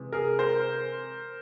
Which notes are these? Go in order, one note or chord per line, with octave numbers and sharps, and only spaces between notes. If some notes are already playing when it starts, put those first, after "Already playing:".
Already playing: C3 E3 G#3
G#4 A#4
A#4 C5